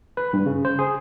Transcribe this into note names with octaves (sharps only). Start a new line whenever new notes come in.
B4
G2
C#3
C5
G#4